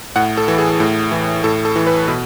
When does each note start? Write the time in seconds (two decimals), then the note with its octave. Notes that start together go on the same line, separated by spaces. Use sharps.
0.16 A2 F#5
0.37 A4
0.48 E3
0.58 G#4
0.80 A2
1.12 E3
1.44 A2 A4
1.65 A4
1.76 E3
1.87 B4
2.08 B2